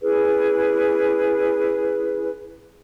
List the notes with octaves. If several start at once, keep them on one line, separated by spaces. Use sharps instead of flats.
C#4 E4 G#4 B4